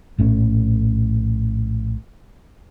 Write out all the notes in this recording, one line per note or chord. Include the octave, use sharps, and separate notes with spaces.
A#1 A2 C#4